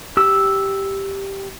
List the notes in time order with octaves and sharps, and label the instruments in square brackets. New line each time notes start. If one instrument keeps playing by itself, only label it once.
[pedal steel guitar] G4 E6